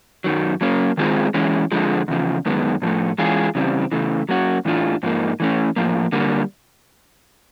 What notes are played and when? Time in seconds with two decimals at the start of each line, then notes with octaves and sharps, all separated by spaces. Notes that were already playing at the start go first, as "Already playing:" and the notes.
0.24 F#2 D#3 F#3
0.61 F#3 A#3 C#4
0.97 D#3 G#3 C4 F4 G#4
1.34 E3 G#3 C#4
1.72 F2 D3 F3 G#3
2.08 E2 C#3 F3
2.46 F#2 D#3 G#3 B3
2.82 A2 F3 A3
3.18 E3 G#3 C#4 F4 G#4
3.55 C#3 E3 G3 C4
3.92 C#3 E3 A3
4.29 F#3 A#3 C#4 F#4
4.65 A2 E3 A3 D4 F4
5.03 G#2 F3 A#3 D#4
5.40 E3 A3 C#4
5.76 A2 F3 A#3
6.12 D3 G3 A#3